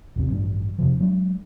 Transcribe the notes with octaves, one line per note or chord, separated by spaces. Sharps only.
A1 E2 C3
A1 G2 D4
F2 C3 F3
F#3 G#3 D4